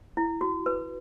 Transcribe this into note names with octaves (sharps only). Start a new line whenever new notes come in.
E4
F#4
B4